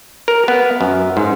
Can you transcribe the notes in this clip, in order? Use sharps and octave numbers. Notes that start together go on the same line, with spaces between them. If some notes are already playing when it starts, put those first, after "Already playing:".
A#4
B3
F#2
G#2